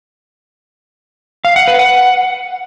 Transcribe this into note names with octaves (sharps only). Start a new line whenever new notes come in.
F5
F#5
B4
F#5